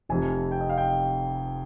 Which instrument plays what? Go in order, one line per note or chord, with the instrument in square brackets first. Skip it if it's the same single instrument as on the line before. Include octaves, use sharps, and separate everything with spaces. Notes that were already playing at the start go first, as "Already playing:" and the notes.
[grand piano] F1 F2 C3 G#5
G5
D#5
F5
G5